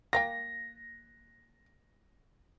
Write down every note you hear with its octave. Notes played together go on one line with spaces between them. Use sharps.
A#3 F5 G5 A#6